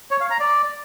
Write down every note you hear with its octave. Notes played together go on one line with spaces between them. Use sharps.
C#5
F5
A#5
D5